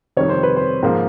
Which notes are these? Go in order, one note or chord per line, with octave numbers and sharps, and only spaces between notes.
F2 C3 D#3 G3 C#5
C5
B4
C5
G#2 F3 A#3